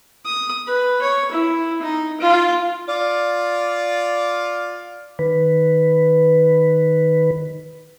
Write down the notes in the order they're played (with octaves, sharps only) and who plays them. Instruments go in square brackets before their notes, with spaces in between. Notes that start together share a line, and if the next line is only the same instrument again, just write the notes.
[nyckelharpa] D#6
B4
C#5
E4
D#4
F4
[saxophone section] F4 D5
[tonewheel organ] D#3 B4